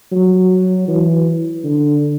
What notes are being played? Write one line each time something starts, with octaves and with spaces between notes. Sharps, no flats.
F#3
E3
D3